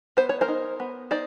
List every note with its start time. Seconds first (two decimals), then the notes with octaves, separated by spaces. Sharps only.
0.17 B3 C5
0.29 C#5
0.41 A#4 C5
0.48 D#4
0.80 B3
1.11 D#4 C5 D5